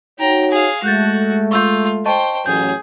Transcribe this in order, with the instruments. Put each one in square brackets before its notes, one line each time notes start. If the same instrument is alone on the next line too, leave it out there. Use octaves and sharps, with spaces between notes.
[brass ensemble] D#4 F#4 C#5 [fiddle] G5 A#5
[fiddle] G#4 F5
[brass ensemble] G#3 A3 [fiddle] F#4 [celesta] F#6 G6 A6
[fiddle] F4 [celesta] C#6 E6 G6
[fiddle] C5 G5 [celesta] D#5 A5 C#6
[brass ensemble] A1 F#3 [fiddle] G#4 [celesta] G6